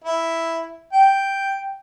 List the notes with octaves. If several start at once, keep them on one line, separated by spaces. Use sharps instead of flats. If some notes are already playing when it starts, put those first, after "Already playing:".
E4
G5